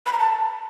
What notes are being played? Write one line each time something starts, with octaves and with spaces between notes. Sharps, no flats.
B5
A#5
A5